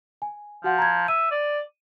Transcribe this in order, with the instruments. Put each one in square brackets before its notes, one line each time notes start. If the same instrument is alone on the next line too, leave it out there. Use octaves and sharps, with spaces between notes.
[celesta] G#5
[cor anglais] F3 [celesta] F#4 F#5
[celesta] A#5 G#6
[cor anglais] E5 [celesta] D#7
[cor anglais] D5